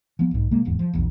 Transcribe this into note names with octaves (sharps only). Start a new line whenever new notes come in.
F3 B3
B1 G#2
C3 G#3 A#3
D1 E2 G#2
F3
A#1 E2